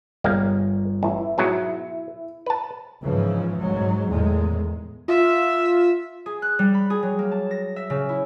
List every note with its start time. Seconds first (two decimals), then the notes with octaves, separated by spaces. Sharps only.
0.24 G1 G3 G#3 A#3
1.03 A1 E4
1.38 G#2 B2 F#3
2.46 B4 A5
3.02 G#2 C#3 E3 F3
3.54 G#2 F#3
4.08 E2 A2 D#3 G#3
5.08 F4 E5
6.26 G#4
6.42 F#6
6.59 G3
6.74 B5
6.90 G#4
7.03 F#3
7.19 A#3
7.31 A5
7.51 A#6
7.76 E5
7.90 C#3
8.09 E4